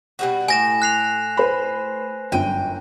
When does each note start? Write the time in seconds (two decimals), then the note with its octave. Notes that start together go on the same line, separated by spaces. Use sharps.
0.19 B2 G3 F#4
0.48 A2 G#5 A#6 E7
0.82 F#6 C7 F7
1.37 B4 C5 B5
2.32 G1 F#2 G5 D#7